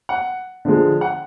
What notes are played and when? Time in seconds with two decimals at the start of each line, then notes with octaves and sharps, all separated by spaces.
0.09 F#5
0.65 D3 F3 G#3
1.01 F#5